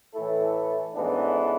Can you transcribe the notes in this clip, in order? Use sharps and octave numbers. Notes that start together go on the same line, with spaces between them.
A2 E3 A3 E4 A4
A1 G#2 E3 B3 D4